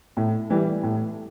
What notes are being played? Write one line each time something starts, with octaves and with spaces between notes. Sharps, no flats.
A2
E3 G3
A2